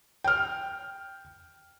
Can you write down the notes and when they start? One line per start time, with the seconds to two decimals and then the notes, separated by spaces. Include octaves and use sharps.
0.24 G5 F6